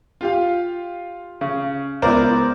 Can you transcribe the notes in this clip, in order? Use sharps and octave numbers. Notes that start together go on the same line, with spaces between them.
F4 G4 F5
C#3
C#2 B3 E4 A#4 C5 D5